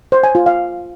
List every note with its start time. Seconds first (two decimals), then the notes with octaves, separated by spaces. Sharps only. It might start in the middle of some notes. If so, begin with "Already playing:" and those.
0.12 C5
0.24 G#5
0.35 F4
0.46 F5